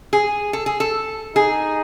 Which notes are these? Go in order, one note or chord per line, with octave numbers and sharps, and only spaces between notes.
G#4
A4
G#4
A4
D#4 G#4